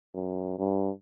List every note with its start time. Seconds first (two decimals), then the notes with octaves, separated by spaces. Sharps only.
0.14 F#2
0.59 G2